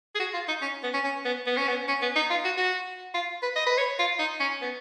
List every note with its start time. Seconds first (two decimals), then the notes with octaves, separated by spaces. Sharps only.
0.15 G#4
0.20 F#4
0.34 F4
0.48 D#4
0.61 C#4
0.83 B3
0.93 C#4
1.04 C#4
1.25 B3
1.46 B3
1.57 C#4
1.68 B3
1.88 C#4
2.02 B3
2.16 D#4
2.30 F4
2.45 F#4
2.57 F#4
3.14 F4
3.42 B4
3.56 D#5
3.67 B4
3.78 C#5
3.99 F4
4.19 D#4
4.40 C#4
4.61 B3